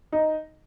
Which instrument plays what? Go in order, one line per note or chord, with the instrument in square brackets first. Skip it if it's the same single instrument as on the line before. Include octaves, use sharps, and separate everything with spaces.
[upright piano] D#4